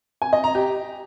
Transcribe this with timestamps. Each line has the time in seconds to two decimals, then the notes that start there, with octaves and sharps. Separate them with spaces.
0.22 G#5
0.33 D#5
0.44 A#5
0.55 G4